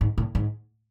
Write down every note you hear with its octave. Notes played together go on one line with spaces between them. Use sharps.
G#2
A2
G#2